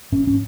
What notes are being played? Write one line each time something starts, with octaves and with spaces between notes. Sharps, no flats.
G#2 C#4
C#4